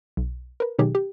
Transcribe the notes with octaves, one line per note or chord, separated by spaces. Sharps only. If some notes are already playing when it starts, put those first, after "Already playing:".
B1
A#4 B4
B2 D#3 F#3 D#4 G4 G#4
G4